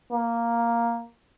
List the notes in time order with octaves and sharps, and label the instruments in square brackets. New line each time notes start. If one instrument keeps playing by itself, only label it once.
[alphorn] A#3